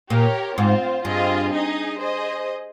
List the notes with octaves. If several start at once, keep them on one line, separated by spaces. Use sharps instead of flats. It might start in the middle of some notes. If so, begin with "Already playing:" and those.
A#2 G4 A#4 C#5
G#2 C4 F4 C5
G2 C4 F4 G#4 D#5
D#4 G#4 D#5
G#4 C5 D#5